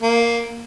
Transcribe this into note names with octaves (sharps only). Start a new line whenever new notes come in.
A#3